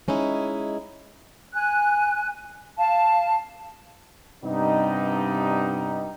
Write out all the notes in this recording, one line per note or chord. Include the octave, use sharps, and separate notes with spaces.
G#3 C#4 D#4 E4
G#5 F#6
F5 A5
G2 C3 G3 B3 D#4